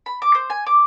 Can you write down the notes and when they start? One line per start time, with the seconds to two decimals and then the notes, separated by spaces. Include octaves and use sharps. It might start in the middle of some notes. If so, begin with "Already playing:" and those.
0.06 B5
0.22 D6
0.35 C5
0.50 G#5
0.67 D6